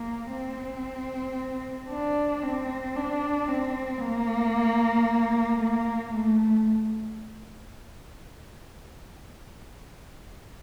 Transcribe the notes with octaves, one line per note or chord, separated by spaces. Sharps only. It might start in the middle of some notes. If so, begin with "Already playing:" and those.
Already playing: A#3
C4
D4
C4
D4
C4
A#3
A#3
A3